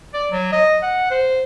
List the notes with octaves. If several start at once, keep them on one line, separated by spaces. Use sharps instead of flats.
D5
F#3
D#5
F#5
C5